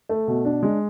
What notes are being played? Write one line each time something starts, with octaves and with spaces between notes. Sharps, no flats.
A3
B2
D4
G#3